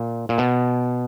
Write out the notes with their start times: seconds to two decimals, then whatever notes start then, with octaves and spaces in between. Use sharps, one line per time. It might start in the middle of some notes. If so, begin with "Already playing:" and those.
Already playing: A#2
0.29 A#2
0.38 B2